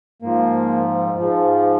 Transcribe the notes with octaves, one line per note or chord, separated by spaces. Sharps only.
G#2 F3 A#3
G#2 F3